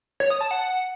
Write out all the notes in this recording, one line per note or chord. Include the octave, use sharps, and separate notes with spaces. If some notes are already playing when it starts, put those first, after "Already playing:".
C#5
D#6
A5
F#5